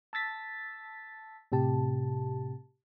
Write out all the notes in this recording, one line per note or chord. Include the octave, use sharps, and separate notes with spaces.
A5 E6 A6 B6
A2 C3 G4 A5